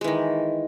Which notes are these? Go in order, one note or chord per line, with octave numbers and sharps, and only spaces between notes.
D#3 E3 G#3